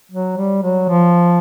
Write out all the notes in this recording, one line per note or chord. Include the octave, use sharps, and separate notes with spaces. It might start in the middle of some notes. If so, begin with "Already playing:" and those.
F#3
G3
F#3
F3